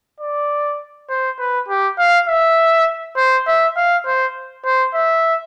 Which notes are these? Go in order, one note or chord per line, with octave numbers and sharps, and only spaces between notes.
D5
C5
B4
G4
F5
E5
C5
E5
F5
C5
C5
E5